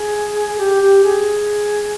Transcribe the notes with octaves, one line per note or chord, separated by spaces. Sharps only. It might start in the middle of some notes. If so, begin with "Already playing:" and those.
Already playing: G#4
G4
G4
G#4